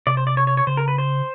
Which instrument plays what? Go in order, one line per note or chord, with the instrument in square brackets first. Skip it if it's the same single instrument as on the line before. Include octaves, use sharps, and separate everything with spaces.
[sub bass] C3 [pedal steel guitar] D5
[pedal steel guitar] C5
D5
C#5
C#5
C#5
[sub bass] C#3 [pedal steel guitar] C5
[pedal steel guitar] A#4
B4
C5